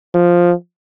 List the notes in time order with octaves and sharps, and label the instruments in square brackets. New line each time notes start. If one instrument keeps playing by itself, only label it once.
[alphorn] F3